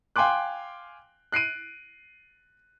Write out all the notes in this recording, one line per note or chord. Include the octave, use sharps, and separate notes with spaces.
F5 G5 G#5 C6 D6 F#6
F#6 C7 D7 D#7